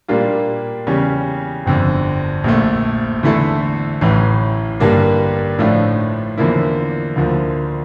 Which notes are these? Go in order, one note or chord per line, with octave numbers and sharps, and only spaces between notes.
A#2 G3 A#3 D4 F4
E2 C#3 G3 C#4
G1 F2 D3
A#1 A#2 A3
E2 D3 A3 E4 A4
A1 A2 E3
G2 D3 G3 A#3 D4
A2 F3 A3 D4 F4
E2 D3 F3 A#3 E4
D2 D3 F3 A#3